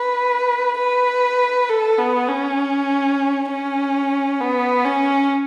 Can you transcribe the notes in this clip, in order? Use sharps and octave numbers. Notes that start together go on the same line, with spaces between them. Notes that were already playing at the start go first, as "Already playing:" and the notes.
Already playing: B4
B4
A4
B3
C#4
C#4
B3
C#4